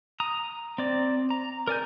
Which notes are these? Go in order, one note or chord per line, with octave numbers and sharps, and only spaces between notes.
A#5 D#6
C4 D5
A#5
A#4 D5 G#5 G6